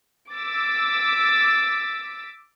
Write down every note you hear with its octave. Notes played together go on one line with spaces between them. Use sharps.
D6 E6 A6 B6